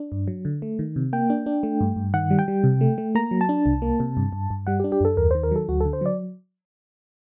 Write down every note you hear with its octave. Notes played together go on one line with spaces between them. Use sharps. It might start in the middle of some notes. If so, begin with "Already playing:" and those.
Already playing: D4
G2
F#3
D3
A3
D#3
C3
A#3 G5
D4
D4
A3
G2
G2
D#3 F#5
G3
G5
G3
C3
A3
A3
A#3 A#5
F#3
A5
D4
C2
A#3
C3
G2
G2
G2
G3 F#5
G4
D4
G4
F#2 A4
D#2 A#4
D#3 C5
A#4
F#3 A4
D2 F#4
D3 A4
C5
F#3 D5